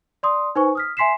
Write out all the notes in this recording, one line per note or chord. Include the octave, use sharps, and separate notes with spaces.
D5 C6 D#6
D#4 B4 C5 G#5 C#6
D#6 F6 B6
E5 G#5 C6 B6 C7 E7